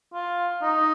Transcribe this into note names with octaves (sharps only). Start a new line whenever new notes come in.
F4
D#4